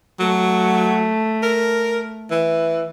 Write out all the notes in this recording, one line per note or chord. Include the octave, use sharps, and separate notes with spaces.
F#3 A3
A#4
E3